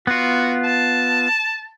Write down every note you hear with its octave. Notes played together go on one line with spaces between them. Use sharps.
B3 F4 F#4
A5